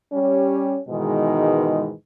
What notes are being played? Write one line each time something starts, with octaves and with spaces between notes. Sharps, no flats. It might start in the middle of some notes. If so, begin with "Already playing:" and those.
G3 C#4 G4 C#5
G#2 B2 D#3 E3 G#3